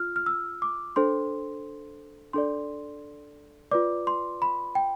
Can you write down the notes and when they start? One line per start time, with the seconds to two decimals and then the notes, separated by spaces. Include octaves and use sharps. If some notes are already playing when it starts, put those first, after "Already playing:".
Already playing: F4 F6
0.16 F6
0.26 E6
0.62 D6
0.96 D4 A4 C5 C6
2.33 D4 A4 D5 C6
3.71 F4 B4 D5 D6
4.07 C6
4.42 B5
4.75 G5